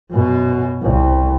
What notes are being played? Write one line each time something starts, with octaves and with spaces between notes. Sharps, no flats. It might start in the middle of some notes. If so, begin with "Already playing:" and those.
F#2 B2
C2